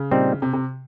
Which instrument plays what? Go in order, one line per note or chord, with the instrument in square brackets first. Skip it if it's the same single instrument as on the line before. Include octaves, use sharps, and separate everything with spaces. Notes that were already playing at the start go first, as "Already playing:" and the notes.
Already playing: [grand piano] C#3
[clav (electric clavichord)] A#2 G3 C4 D#4
[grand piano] C3
C3